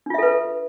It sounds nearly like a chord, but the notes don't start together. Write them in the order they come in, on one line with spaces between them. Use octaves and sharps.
D4 F4 E5 A4 B4